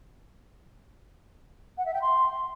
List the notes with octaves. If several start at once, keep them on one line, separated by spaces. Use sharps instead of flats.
F#5
E5
G5
C6